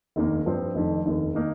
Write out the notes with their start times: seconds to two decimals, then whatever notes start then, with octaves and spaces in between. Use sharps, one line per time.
0.16 F1 D#2 D#3 A#3
0.46 G2 F3 C4
0.75 F1 F2 D#3
1.06 F1 D#2 D#3
1.35 D#3 A#3 D#4